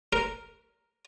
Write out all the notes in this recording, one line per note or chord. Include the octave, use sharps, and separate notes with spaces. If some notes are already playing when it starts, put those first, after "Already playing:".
A#4